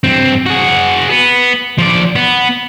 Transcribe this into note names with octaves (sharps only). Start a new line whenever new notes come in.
G2 C4
F#4 G#4
B3
F3 D5
B3